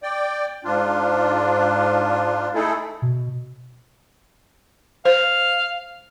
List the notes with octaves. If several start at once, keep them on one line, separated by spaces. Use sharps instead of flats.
D5 G5
G#2 D4 F4
A3 D#4 E4 G#4 A4
B2
C5 F5